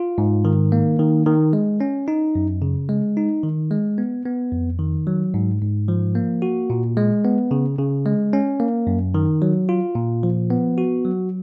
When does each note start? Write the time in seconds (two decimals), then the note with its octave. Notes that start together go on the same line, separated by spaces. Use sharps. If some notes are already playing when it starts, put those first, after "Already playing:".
Already playing: F4
0.18 G#2
0.45 D#3
0.72 A#3
0.99 D#3
1.26 D#3
1.53 G#3
1.81 C#4
2.08 D#4
2.35 F#2
2.62 C#3
2.89 G#3
3.17 D#4
3.44 D#3
3.71 G#3
3.98 B3
4.26 B3
4.52 F2
4.79 D#3
5.07 F#3
5.34 G#2
5.61 G#2
5.88 F3
6.15 A#3
6.42 F#4
6.70 A#2
6.97 G#3
7.25 B3
7.51 C#3
7.79 C#3
8.06 G#3
8.33 C#4
8.60 A#3
8.87 F#2
9.14 D#3
9.42 F#3
9.69 F4
9.95 A#2
10.23 F3
10.50 B3
10.78 F#4
11.05 F#3